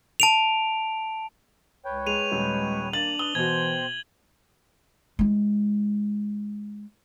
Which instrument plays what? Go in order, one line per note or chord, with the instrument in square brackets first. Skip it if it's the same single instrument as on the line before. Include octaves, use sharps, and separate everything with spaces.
[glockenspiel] A5 D7 F7
[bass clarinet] C#2 [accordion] B4 C#5 G5
[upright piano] G#3 [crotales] D#7 F7
[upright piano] D#1 [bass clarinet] G#3
[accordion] A#3 [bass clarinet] D4 [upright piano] A6 [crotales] F#7
[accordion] B4 [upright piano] D#6 [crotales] G7
[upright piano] B2 F#4 [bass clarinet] E3 [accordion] C5 G5 [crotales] G#6
[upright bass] G#3 E4